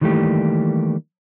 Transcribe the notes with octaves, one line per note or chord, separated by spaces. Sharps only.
D#3 E3 G3 A3 A#3 G4